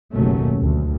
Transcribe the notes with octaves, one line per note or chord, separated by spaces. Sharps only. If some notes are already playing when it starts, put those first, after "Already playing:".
F#1 D#2 B2 F#3 A3 C#4
D2